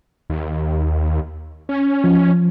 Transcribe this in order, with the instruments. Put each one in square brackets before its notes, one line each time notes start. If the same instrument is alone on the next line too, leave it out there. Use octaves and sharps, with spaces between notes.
[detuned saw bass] D#2
C#4
[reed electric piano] F3